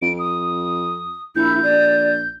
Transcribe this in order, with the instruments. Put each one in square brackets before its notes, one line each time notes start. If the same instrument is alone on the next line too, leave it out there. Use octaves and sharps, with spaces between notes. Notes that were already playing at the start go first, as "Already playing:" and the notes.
[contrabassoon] F2 [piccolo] D7
[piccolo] D#6
[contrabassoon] A#1 [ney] E4 [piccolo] G6
[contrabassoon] A#1 [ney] D5